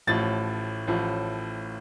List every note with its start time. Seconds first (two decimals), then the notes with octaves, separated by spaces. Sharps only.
0.07 A1 A2 F3 A6
0.87 A1 A2 F3